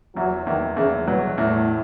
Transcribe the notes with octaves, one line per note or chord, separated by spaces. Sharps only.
E2 F#3
E2 D#3
E2 C#3
B2 F#3
E2 A2